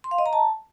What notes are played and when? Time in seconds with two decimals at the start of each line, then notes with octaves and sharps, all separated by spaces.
0.04 C6
0.11 F5
0.18 D#5
0.26 A#5
0.33 A5